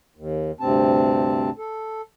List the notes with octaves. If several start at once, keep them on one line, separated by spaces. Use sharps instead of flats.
D#2
D2 G2 C3 C4 A5
A4